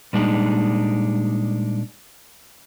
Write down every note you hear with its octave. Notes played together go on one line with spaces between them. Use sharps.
A#2 G3 G#3 D4 D#4